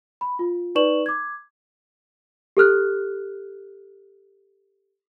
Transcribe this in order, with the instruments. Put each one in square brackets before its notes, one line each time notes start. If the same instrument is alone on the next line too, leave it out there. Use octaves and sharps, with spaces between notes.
[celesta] B5
F4
D#4 B4 D5 C#6 E7 F#7
D6 G#6
G4 A4 F6 F#6